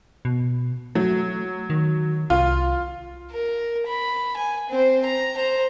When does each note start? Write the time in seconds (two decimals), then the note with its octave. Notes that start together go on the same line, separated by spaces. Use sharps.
0.25 B2
0.95 F#3 A3
1.70 D#3
2.30 C2 F4
3.31 A#4
3.87 B5
4.37 G#5
4.70 C4 C5
5.05 A#5
5.36 C5 A#5